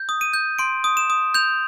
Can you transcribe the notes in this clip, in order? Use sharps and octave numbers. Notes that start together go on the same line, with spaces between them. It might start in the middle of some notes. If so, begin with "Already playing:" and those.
Already playing: G6
D#6
D#7
G6
C6 D7
D#6
E7
D#6
G6 F7